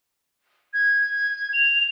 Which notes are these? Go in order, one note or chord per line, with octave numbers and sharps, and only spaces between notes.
G#6
F7